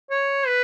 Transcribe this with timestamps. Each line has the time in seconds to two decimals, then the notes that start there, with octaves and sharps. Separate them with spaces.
0.10 C#5
0.47 B4